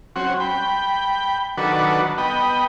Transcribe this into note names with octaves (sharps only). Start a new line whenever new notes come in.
F#3 C4 C#4 F#4
G5 B5
D#3 F#3 D4 F#4 A4 B4
B3 D#5 G5 B5